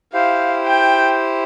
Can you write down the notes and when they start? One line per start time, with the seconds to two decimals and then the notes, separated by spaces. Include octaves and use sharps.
0.13 E4 G4 C5 F5
0.67 G5